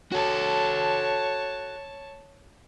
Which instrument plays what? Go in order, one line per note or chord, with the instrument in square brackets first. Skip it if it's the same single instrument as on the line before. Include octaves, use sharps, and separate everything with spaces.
[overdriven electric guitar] F#4 A4 [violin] C#5 A5